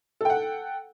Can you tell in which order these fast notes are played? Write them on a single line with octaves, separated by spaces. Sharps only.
A4 G5 F#5